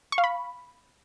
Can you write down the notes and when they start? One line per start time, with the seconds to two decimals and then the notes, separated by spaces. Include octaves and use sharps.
0.12 C#6
0.18 F5
0.24 B5